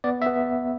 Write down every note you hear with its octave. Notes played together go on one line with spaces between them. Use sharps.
B3 D5
E5
B3